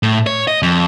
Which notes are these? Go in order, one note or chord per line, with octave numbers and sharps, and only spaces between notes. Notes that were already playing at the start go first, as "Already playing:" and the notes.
A2
C#5
D#5
F2